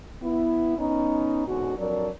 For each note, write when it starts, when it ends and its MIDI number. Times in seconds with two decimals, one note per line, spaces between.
0.22 0.77 59
0.22 0.77 64
0.78 1.45 59
0.78 1.45 61
0.78 1.45 63
1.47 1.75 44
1.47 1.75 47
1.47 1.75 50
1.47 1.75 61
1.47 1.75 66
1.78 2.08 41
1.78 2.08 54
1.78 2.08 62
1.78 2.08 70
1.78 2.08 74